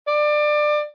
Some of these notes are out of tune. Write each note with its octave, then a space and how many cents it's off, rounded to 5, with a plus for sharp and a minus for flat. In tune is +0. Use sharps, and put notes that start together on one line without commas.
D5 +25